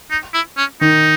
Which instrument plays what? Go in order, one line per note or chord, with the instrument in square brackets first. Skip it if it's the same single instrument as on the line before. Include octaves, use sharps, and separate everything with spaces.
[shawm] D#4
E4
C#4
[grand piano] D#3 [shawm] D#4